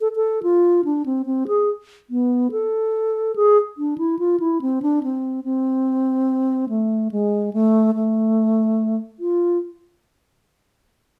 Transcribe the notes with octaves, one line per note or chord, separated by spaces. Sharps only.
A4
A4
F4
D4
C4
C4
G#4
B3
A4
G#4
D4
E4
F4
E4
C4
D4
C4
C4
A3
G#3
A3
A3
F4